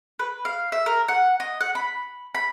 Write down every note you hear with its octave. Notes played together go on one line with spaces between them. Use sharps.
B4
F5
E5
A#4
F#5
D#5
F#5
B5
B5